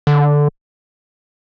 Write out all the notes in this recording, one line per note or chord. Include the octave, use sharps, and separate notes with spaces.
D3